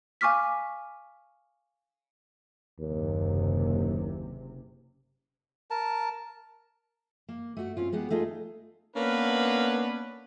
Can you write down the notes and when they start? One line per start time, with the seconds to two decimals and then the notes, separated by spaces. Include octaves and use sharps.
0.21 F5 G#5 C#6 D6 F6 B6
2.80 F#1 D#2 C3
5.71 A#4 A5
7.29 A#3
7.57 A3 F#4
7.77 C4 C#4 F4
7.92 G#3 B3 G4 F#5
8.10 A3 D#4 F4 G#4
8.96 A#3 B3 C#4 D4 B4